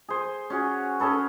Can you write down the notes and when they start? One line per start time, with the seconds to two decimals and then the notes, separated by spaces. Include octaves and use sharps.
0.09 G#4 C5
0.50 C#4 F#4 G#4
1.00 C#4 G#4 A4 B4